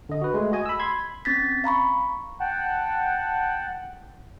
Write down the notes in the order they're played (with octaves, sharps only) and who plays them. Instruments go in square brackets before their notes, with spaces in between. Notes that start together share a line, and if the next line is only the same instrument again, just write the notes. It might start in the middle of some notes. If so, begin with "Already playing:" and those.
[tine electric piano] D3 D#5
F#4 B4
G#3 A3
F#4 D#5 G#5
B5 E6
B5 C6 G#6
[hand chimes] C4 C#4 A6 B6
F5 A#5 B5 C#6
[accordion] F#5 G5 A5